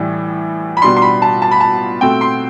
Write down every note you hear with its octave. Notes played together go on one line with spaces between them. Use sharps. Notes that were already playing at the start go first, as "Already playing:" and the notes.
Already playing: A2 E3 G3
B5
B2 G3 D4 C6
C6
B5
A5
A5
B5
A5
B2 A3 C4 G5
C6